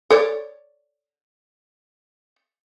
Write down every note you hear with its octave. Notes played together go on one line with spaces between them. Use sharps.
A4 C#5 D5